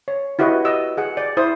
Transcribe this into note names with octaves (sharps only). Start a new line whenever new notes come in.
C#5
E4 F#4 G4 B4 D#5
G4 D#5 E6
G#4 F#5
D5
E4 C5 D#6